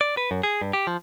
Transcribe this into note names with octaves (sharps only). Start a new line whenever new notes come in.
D5
B4
F#2
G#4
G2
G4
F3